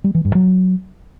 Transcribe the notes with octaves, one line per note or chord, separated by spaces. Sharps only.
G3
E3
G2
F#3